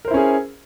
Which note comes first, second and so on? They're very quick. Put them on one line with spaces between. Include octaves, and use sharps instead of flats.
A#4 C5 E4 C#4 G#4